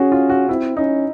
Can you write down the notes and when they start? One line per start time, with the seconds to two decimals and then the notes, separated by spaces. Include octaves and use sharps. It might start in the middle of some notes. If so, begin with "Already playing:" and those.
Already playing: C#4 F#4 G#4
0.12 F4
0.30 F#4
0.49 C4 E4
0.77 C#4 D#4